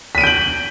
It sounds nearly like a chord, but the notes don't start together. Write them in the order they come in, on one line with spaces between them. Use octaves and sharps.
B6 D#7 D7 G6 F#7